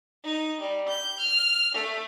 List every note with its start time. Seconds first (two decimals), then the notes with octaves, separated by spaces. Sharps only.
0.24 D#4
0.60 G3
0.89 G6
1.21 F6
1.74 A3